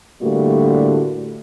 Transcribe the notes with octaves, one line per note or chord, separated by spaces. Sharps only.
A2 D3 G3 A3 A#3 F#4